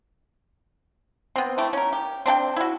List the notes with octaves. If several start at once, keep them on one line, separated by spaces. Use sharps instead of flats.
B3 C4
A3 E4 G4
C#4 A#4
G4
C4 D4 A4 G5
E4 F#4